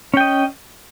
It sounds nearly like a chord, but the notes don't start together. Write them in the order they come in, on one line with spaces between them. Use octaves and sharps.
C#4 G5 D#5